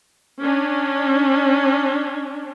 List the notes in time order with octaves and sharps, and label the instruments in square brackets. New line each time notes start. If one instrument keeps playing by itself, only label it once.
[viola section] C#4 D4